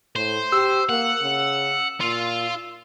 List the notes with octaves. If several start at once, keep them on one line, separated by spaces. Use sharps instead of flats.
A2 C5
G4 E6
A#3 F#5
C#3
A#2 F4